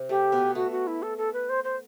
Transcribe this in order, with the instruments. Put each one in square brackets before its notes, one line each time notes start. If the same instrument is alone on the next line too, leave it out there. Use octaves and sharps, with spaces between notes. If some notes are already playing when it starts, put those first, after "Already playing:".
Already playing: [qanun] C3 C4
[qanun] A3 [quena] G4
[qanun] B2 B3
[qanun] A3 [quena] F#4
[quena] F#4
E4
A4
A4
B4
C5
C5